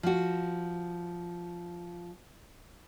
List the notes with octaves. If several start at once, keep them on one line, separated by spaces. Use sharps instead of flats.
F3 F#4